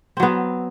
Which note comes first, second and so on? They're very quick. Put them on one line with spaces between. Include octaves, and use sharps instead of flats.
C4 F#3 B3